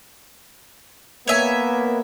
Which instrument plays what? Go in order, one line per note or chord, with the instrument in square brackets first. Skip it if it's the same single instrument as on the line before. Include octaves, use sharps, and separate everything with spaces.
[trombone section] A#3 B3 [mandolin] C#5 E5 G#5